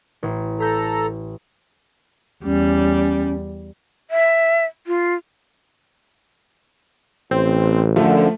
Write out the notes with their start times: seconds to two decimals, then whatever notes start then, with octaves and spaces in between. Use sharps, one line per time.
0.23 A1
0.60 A4 A#5 G6 B6
2.44 E2 G3 C#4
4.11 E5
4.87 F4
7.31 A1 C4
7.96 F#2 D3 F3 A3